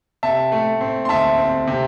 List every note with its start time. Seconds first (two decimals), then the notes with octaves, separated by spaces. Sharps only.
0.23 C3 E5 A5
0.52 A3
0.81 C4
1.05 C6
1.09 D2 E5 A5
1.38 C4
1.67 C3